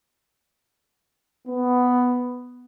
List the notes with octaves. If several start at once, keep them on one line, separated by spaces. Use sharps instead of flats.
B3